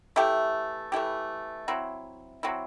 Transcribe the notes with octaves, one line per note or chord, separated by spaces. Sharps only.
E3 A3 E4 G4
E3 A3 E4 G4
F#3 C4 E4
F#3 C4 E4